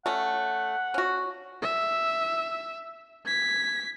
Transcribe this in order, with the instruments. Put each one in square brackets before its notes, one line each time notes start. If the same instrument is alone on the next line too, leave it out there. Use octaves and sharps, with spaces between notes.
[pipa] A3 C#4 [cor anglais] F#5
[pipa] C#4 F#4
[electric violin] E5
G#6 B6